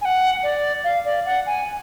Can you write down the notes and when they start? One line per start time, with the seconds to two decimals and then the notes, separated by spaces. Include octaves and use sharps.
0.02 G#5
0.05 F#5
0.43 D5
0.84 F5
1.05 D5
1.26 F#5
1.47 G#5